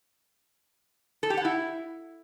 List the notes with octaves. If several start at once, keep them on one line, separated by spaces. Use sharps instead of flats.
A4
G4
F#5
E4